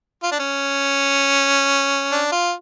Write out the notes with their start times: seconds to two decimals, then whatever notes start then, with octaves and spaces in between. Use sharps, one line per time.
0.23 F4
0.31 D4
0.39 C#4
2.12 D4
2.32 F4